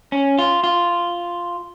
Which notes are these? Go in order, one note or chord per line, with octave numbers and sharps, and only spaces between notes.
C#4
F4
F4